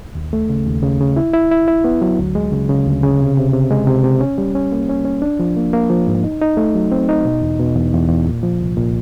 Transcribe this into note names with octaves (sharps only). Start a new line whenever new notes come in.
D#2
A3
C#3
D#2
C#3
C#3
E4
E4
E4
E4
B3
F#3
D2
G#3
C#3
C#3
D2
C#3
C3
C3
C3
G#3
C3
C3
C#4
G3
C#4
A#3
C#4
C#4
D4
F3
A#3
A#3
F3
G#2
D#4
D#4
A3
F#3
C4
D#4
B2
E2
B2
E2
E2
E2
A#2
F3
C2
A#2